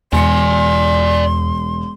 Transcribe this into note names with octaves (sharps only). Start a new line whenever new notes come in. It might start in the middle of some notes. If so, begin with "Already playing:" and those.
E1 E2 D5 G#5 C6 C#7